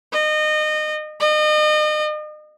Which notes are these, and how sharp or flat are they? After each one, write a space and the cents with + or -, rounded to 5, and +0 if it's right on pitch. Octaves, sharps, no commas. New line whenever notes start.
D#5 -25
D#5 -35